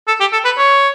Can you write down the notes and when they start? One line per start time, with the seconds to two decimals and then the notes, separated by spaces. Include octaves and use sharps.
0.08 A4
0.20 G4
0.33 A4
0.45 B4
0.58 C#5